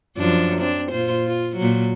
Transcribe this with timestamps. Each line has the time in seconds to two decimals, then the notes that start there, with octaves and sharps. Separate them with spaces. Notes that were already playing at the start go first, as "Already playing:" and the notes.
0.17 F#2 F3 D4
0.60 C4 D4
0.92 A#2 F4 C5
1.26 F4
1.57 A#2 F#3